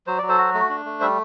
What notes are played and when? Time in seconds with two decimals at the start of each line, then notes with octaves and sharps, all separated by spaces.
0.07 F#3 C5
0.18 F#3 D5
0.29 A4 C5
0.38 F#4
0.54 A3
0.69 D4
0.85 A3
1.00 G3 C5 E5